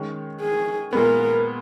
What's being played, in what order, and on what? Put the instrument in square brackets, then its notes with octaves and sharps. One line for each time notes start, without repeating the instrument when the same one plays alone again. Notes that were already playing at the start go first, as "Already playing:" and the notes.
Already playing: [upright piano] D#3 G#3 C#4
[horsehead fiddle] G#4
[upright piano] A#2 G#3 B3 [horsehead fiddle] A#4